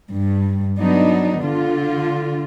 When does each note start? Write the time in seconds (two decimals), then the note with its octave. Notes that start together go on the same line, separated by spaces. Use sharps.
0.10 G2
0.78 F#3 B3 D4 D#4
1.43 D3 F4